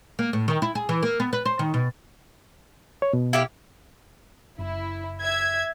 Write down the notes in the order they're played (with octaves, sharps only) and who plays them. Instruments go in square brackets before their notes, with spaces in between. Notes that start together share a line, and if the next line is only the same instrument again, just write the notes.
[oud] A#3
A2
D#3
E4
G#4
E3
A#3
B3
B4
C5
D#3
B2
[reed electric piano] C#5
B2
[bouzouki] E4 G4 F5
[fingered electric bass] F#1 [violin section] E4
[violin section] E5 G#6